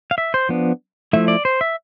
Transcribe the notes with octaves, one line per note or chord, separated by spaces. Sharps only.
F5
E5
C5
F3 B3 D4
F3 A3 E4 E5
D5
C5
E5